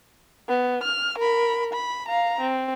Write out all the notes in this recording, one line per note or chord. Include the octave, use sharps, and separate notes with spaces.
B3
F6
A#4 B5
B5
F5 A#5
C4